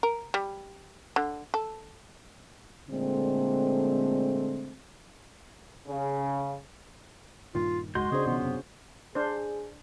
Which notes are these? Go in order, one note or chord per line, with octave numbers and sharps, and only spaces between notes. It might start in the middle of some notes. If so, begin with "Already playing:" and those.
A#4
G3
D3
A4
A#2 D3 G#3 A3 C4
C#3
G2 A#2 D#3 F4
F#1 C#2 G#2 G#3 F#4 D#5 C6 G6
C#3 C4 D4 G#4 C5
B2 D#3 F3 B3
F#2 C3
D4 G#4 C5